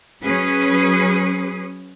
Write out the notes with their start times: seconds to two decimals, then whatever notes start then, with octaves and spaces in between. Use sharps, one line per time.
0.22 F#3 C#4 G#4 B4